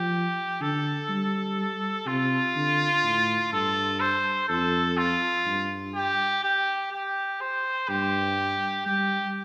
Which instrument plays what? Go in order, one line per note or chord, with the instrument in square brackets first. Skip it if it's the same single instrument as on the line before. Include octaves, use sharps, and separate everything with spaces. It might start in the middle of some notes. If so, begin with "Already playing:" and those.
Already playing: [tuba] F3 [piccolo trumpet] G4
[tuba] D3 [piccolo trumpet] A4
[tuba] G3
[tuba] C3 [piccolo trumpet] F4
[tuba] D3
A2
[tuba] G2 [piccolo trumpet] A4
[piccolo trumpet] C5
[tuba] F2 [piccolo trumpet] A4
[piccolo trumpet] F4
[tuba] G2
[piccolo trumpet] G4
G4
G4
C5
[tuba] G2 [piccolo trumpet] G4
[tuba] G3 [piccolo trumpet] G4